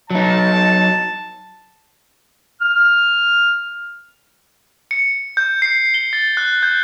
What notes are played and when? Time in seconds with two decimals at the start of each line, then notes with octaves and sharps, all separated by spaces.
0.11 F#3 D#4 A5
2.60 F6
4.91 C#7
5.37 G6
5.62 C7
5.94 G7
6.13 A6
6.37 F#6
6.63 G6